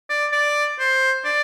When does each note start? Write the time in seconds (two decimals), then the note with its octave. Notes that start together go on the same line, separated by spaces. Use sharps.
0.10 D5
0.32 D5
0.79 C5
1.25 D5